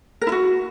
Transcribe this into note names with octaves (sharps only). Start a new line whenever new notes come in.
A#4
E4
F#4